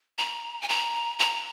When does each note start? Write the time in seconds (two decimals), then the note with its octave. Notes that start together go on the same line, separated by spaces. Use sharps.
0.18 A#5
0.62 G#5
0.69 A#5
1.19 A#5